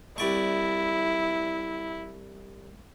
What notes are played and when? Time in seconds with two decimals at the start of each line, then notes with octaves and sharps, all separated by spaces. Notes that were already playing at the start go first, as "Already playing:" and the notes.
0.18 C2 E4 D5 C#6